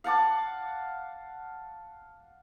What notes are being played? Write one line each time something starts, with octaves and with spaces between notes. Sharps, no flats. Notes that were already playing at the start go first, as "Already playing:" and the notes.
F5 F#5 A5 D6